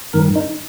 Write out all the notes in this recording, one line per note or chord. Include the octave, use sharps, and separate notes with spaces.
G2 D#3 A#4
D#4